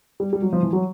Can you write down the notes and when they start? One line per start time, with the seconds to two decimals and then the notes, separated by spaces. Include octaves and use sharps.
0.20 G3
0.33 G3
0.42 F#3
0.53 F3
0.63 E3
0.73 F#3